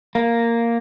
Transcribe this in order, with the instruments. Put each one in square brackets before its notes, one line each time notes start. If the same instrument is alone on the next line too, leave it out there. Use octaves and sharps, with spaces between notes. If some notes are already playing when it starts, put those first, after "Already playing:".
[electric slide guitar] A#3